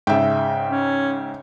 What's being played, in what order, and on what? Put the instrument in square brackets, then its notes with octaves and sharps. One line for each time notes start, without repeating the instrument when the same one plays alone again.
[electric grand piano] G#2 C#3 [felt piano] E5 G5
[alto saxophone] C#4